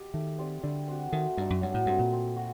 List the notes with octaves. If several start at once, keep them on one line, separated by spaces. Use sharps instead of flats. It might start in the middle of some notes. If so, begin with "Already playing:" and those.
Already playing: G4 D#5
D#3 A3
C4 G4 D5
D3 G3
C4 F#4
D#3 A3
G2 D#4 A4 D5
F#2
G2 F#3
A2
G2 A3 C4
A#2
C4
F#4